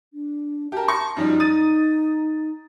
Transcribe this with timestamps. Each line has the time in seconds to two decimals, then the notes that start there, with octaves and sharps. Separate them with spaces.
0.14 D4
0.72 G4 A#4 A5
0.88 C6 C#6 A#6
1.17 F#2 F3 G3 D#4
1.40 D#6 A6 D#7